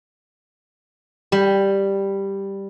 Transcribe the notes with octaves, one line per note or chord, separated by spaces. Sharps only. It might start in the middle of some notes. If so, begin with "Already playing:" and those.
G3